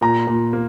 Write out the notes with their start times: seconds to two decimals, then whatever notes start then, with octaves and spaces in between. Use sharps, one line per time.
0.01 A#2 A#5
0.27 A#2
0.53 A#3